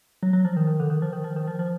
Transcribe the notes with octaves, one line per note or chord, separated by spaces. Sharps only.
F#3
F#3
F3
D#3
D#3
D3
D#3
F3
D#3
F3
D#3
F3
F3